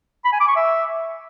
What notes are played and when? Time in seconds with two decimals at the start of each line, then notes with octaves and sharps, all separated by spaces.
0.25 B5
0.32 G#5
0.40 D6
0.48 C#6
0.56 E5